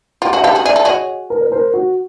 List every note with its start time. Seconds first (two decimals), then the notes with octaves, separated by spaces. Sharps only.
0.22 F4 G4 F#5
0.30 F5
0.33 F#4 G#4
0.37 E5 F#5
0.44 G4 A4 D#5 F5
0.55 F#4 G#4
0.65 G#4 D5 E5
0.76 A4
0.85 F#4 G#4 C#5 D#5
1.30 A#4
1.41 B4
1.52 A#4 C5
1.74 F#4